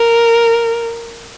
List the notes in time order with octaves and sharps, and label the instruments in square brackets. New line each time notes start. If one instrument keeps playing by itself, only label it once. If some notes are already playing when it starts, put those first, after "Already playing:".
Already playing: [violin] A#4